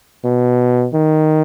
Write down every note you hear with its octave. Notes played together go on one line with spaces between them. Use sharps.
B2
D#3